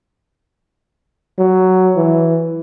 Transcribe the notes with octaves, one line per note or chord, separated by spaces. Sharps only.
F#3
E3